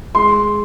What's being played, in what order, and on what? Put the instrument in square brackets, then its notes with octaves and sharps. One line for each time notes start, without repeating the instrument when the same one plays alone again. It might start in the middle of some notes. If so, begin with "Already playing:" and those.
[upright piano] G#3 C6